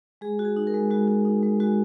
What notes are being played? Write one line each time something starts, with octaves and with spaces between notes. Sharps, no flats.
G#3 G#4
F#4
G#4
D#4
A#4
G#3
G#3 F#4
F#4
D#4
G#3
G#3 F#4